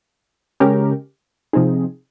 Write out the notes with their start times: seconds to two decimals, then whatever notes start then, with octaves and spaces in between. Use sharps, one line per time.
0.60 C#3 G#3 C#4 G4 A#4
1.53 C3 F3 C4 D#4 G#4